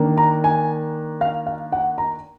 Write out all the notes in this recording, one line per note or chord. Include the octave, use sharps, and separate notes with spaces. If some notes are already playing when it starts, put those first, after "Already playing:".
Already playing: D#3 A#3 D4
A#5
G#5
F5
F5
F#5
A#5